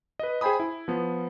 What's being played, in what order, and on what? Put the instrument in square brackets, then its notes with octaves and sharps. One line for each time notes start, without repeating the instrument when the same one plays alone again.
[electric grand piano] B4 D#5
G#4 C5 G5 G#5 B5 D#6
E4
F3 B3